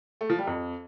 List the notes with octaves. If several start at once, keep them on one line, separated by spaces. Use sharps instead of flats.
A3
F3
G3
F2